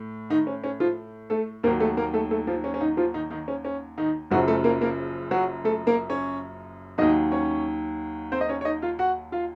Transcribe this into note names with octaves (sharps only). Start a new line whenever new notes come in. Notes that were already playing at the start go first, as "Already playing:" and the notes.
Already playing: A2
D#3 D#4
C#4
C#4
F3 F4
A3 A4
D#2 D#3 F#3 A#3 A#4
A3 A4
A#3 A#4
A3 A4
A3 A4
F3 F4
C#4
C#4
D#3 D#4
F3 F4
D#3 D#4
D#3 D#4
C#4
C#4
D#3 D#4
F#1 F#2 C#3 F3 F#3 F#4
A3 A4
A#3 A#4
A#3 A#4
F#3 F#4
A3 A4
A#3 A#4
C#4 C#5
D#2 D#3 F#3 D#4 D#5
C#4 C#5
C4 C5
D#5
C#4 C#5
C#5
D#4 D#5
F4 F5
F#4 F#5
F4 F5